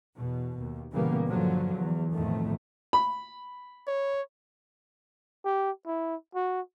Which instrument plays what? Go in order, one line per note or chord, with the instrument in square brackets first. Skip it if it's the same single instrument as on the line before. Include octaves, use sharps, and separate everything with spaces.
[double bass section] E2 B2
D#2
A#2 C#3 E3 G3 A#3 B3
G2 D3 F3 F#3
E2
B1 F2 A2 D#3 A3
[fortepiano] B5
[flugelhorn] C#5
[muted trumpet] G4
E4
F#4